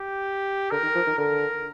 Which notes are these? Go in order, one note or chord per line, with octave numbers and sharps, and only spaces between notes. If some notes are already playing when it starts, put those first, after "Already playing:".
Already playing: G4
D3 A#4
D#3
F3
D#3
D3 A#4